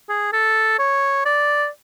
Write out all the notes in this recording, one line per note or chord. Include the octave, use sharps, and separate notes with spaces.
G#4
A4
C#5
D5